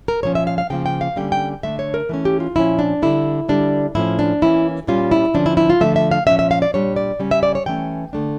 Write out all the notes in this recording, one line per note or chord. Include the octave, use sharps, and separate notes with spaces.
A#4
A#2 F3 C#4 C#5
E5
F5
F5
C#3 F3 A#3 G5
G5
F5
D3 G3 A#3 C#4 G5
G5
D3 A3 D4 E5
C#5
A#4
E3 A3 C#4
G4
F4
A#2 F3 C#4 E4
D4
D3 G3 D4 E4
D3 G3 D4
A2 F3 C#4 E4
D4
E3 A#3 C#4 E4
A#2 G3 C#4 F4
E4
D3 F3 C#4 D4
E4
E4
F4
D3 F3 A3 E5
E5
F5
A#2 F3 A3 C#4 E5
E5
F5
D5
A#2 G3 D4 C#5
D5
C#3 G3 C#4
E5
D5
C#5
E3 A3 C#4 G5
D3 A3 D4